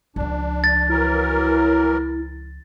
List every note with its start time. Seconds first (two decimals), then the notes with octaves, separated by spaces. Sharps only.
0.16 C#2 F3 D4
0.64 A6
0.89 E3 F#3 E4 A#4